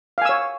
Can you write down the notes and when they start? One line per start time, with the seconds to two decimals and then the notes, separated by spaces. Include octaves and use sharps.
0.18 F5
0.22 G#5
0.25 E6
0.29 C#5